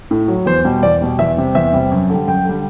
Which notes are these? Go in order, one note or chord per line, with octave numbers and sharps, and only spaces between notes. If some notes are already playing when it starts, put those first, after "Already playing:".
A2
F#3
E2 C5
B2 G3
E2 D5
B2 G3
E2 E5
C3 G3
E2 E5
C3 G3
F#2
D3 G3
F#2 G5
D3 G3